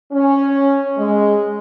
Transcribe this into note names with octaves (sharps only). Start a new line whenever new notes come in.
C#4
G#3